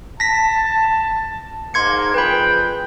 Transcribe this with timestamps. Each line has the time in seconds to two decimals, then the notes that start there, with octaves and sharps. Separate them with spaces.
0.20 A5 A#6 B6
1.74 G#2 A#3 C6 G#6 C#7
2.14 F2 G#4 B4 G5 B5